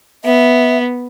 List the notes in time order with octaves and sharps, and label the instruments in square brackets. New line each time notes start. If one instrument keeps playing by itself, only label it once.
[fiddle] B3 [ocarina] E5